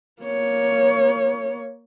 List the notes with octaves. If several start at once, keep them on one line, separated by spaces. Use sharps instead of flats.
A#3 C#5